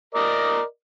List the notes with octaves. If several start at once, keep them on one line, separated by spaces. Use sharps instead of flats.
A#4 D5 D#5